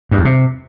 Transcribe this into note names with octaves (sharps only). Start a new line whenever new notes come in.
G2
E2
C3